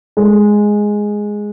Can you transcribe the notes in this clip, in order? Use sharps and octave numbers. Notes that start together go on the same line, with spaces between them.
G#3